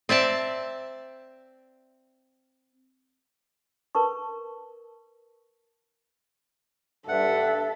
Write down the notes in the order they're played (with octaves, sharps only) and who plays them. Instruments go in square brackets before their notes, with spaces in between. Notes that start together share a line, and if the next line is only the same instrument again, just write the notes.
[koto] C4 D5 E5 A5
[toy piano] A#4 B4 A5 C#6
[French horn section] G2 [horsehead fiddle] A4 [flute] E5 [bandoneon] F#5